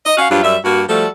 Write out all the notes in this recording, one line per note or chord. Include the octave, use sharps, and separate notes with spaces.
D#5
C#4 F#4 F5
G2 F#3 D4 F4 G4
F#2 G3 E5
G2 A#3 F#4
F3 G3 A3 F#4 A4